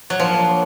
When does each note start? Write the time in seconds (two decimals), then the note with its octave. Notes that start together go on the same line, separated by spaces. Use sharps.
0.10 F#3
0.20 F3 A#3 D4 F4 A#4 C#5